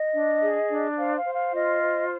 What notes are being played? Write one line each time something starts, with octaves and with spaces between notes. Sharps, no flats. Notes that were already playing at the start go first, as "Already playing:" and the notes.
Already playing: D#5
D4
G#4
D4
C5 F5
F5
C5
F5
F4 D#5
C5